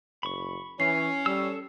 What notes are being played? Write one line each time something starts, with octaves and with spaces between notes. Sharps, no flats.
F#1 B5 C#6
E3 C#4 C7
G3 A4 E6